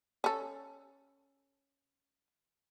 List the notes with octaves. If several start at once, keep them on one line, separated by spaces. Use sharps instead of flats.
C#4 A4